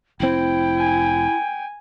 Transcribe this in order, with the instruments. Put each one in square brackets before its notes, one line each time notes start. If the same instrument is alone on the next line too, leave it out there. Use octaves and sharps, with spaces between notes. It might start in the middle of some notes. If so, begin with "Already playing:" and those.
[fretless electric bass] F1 C4 [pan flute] E4 [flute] G5
[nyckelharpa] G#5